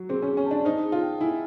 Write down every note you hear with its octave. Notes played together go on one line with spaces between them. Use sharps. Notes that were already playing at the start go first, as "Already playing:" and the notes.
Already playing: F#3
C4 G#4
C#4
G#4
C#4
D4 A5
D#4 C5
G#4
F4
G5
E4 G#5